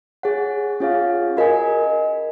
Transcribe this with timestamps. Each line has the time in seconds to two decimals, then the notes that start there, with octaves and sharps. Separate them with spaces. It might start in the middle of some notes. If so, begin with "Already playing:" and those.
0.23 G#4 C#5 F#5
0.80 C#4 F4 G#4 C#5 F5
1.37 F#4 A#4 D#5 G#5